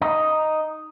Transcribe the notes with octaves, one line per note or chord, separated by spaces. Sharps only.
D#4